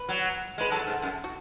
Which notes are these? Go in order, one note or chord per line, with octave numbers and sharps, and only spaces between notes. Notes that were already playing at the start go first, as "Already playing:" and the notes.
Already playing: B4
F#3
G#3 B4
F#3 A4
G#2
F#2
F#4